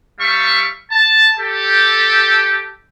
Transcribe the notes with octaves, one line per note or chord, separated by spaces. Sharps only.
G3 E5 F5 C#6
A5
G4 A4